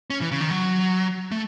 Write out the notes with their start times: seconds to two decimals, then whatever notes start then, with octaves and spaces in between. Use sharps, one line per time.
0.10 C#4
0.21 E3
0.32 C#3
0.41 D#3
0.50 F#3
1.32 A3